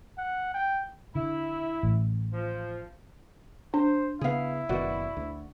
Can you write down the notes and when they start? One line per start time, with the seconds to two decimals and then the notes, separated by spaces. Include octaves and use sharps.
0.18 F#5
0.54 G5
1.15 D3 E4
1.83 A1
2.33 F3
3.74 D4 C5
4.21 C#3 B3 E4 G#4 F5
4.69 F#1 B2 D#3 F#4 D5 F#5
5.17 D2